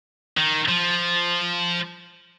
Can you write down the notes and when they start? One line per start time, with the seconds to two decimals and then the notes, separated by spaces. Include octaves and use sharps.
0.38 D#3
0.69 F3